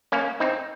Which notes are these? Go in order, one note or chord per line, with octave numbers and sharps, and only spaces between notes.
A#3 C#4
C4 D#4